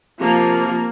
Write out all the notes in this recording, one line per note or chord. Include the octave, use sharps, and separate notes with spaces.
C3 F3 A#3